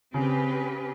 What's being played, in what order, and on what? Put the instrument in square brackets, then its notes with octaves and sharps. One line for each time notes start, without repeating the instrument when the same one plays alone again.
[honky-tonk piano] C#3 [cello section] C4 G4 B4